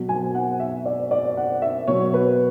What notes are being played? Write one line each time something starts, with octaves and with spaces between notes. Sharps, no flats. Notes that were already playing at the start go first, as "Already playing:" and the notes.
Already playing: B2 F#3
G#5
F#5
E5
D5
D5
F#5
E5
B2 F#3 C#5
B4